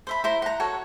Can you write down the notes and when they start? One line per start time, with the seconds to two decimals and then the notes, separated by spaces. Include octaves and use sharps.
0.07 C5 E5 B5
0.24 E4 C5 A#5
0.42 F#5 A#5
0.60 F#4 A4 C#5 F#5